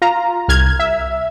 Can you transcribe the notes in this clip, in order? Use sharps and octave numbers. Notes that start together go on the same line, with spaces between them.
F4 A#5
C2 F6 G#6
E5